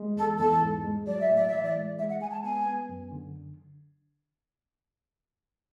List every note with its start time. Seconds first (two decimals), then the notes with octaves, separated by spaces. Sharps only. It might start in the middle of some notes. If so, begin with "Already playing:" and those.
Already playing: G#3
0.17 E2 A4
0.39 E2 A4
0.62 G#2
0.84 G#3
1.07 F#3 D5
1.21 E5
1.30 A2
1.35 D5
1.49 E3 E5
1.62 D5
1.75 G#3
1.98 G#3 E5
2.10 F#5
2.21 G#3 G#5
2.33 A5
2.44 B3 G#5
2.66 B3
2.89 F#2
3.12 D3